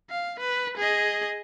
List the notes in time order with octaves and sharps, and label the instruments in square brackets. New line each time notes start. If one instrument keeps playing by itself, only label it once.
[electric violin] F5
B4
G#4 D#5